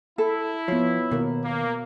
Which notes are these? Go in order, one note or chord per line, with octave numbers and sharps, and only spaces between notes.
E4 A4
F3 B3 C#5
D#2 B2 A#4
A#3